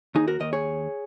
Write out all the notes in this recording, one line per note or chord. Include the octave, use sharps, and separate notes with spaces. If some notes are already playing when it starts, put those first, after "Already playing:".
D#2 D#4 G#4
F#4 A#4
D#2 A#4 D#5
G#4 C#5